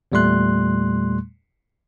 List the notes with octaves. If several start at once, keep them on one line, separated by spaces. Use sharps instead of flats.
E2 A#2 G3 A3 C6 F#6